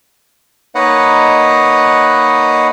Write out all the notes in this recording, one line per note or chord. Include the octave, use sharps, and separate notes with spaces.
A#3 D#4 B4 C#5 D#5 F#5